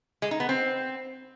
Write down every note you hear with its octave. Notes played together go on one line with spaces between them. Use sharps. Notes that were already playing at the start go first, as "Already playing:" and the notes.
G#3
D#4
B3
C4